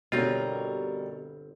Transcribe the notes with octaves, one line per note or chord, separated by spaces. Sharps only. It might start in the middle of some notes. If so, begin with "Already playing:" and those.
G1 B2 G3 C4 C#4 F4 A#4